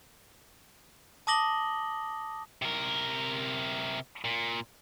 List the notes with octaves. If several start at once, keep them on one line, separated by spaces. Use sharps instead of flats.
A5 D6 D#6 A#6 F#7 G7
C3 A#4
A#2